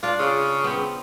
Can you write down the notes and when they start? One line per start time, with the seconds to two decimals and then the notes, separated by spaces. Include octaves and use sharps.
0.03 D4 F4 D5
0.19 C#3 F4
0.64 B3 C4